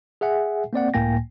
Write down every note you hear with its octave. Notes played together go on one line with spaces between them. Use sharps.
G#4 E5 F#5 G#5
A#3 C4 D5 F#5
C#2 A2 A#3 G5 G#5 A#6